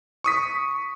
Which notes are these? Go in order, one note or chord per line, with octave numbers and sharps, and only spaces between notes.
C#6 D#6 B6